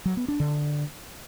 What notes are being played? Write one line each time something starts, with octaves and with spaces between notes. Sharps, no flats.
F#3
B3
D4
D3